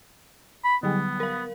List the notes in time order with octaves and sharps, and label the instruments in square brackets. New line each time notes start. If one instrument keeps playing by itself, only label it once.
[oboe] B5
[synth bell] D3 F#3 G3 [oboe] B3
[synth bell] A#4 F5